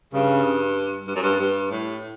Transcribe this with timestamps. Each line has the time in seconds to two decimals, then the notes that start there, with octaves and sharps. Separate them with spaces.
0.13 G2 C#3
1.07 G2
1.16 F#2
1.23 G2
1.39 G2
1.71 A2